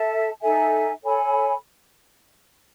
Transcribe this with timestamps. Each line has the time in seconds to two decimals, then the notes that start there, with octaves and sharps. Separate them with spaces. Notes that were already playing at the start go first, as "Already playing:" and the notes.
Already playing: A4 E5 A5
0.41 D#4 A4 E5 G#5
1.03 A4 C#5 G#5 B5